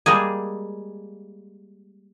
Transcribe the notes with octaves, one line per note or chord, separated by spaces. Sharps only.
G3 G#3 A#3 G#4